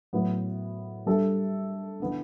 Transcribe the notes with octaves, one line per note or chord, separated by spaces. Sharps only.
A2 F#3 B3
G3 D4 A4 E5
C#3 E3 B3 D4